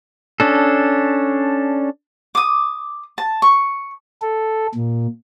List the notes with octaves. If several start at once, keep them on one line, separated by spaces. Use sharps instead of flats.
C#4 D4 A4
D6 D#6
A5
C#6
A4
A#2